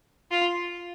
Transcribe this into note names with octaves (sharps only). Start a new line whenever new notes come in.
F4